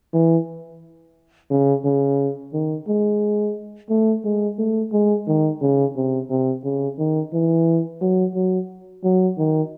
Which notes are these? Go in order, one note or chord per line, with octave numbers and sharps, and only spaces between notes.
E3
C#3
C#3
D#3
G#3
A3
G#3
A3
G#3
D#3
C#3
C3
C3
C#3
D#3
E3
F#3
F#3
F#3
D#3